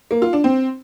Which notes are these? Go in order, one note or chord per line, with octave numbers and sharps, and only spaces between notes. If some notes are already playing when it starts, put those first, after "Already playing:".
A#3
F4
D4
C4